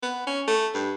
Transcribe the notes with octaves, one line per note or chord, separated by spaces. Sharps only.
B3
C#4
A3
G2